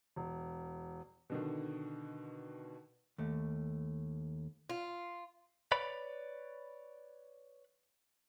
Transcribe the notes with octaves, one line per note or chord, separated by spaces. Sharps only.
E1
B2 D3 D#3
D#2 A3
F4
B4 C#5 D5 B5